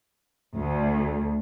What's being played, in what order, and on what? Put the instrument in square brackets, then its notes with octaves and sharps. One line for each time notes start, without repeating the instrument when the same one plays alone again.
[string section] D2